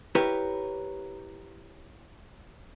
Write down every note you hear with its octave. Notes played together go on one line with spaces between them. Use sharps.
E4 G4 A#4 B4 C#5